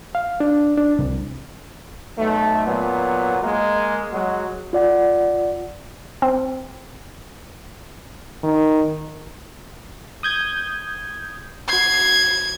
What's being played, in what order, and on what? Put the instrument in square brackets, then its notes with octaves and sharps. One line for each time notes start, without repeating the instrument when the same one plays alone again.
[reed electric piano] F5
D4
D4
C2
[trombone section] B1 A3
A#2 F#3 B3
G#3 A#3
F#3 G#3 F#4
[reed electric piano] F4 D5 F#5
[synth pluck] C4
[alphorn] D#3
[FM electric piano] D#6 G6 G#6
[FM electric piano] F#4 C7 [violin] G#6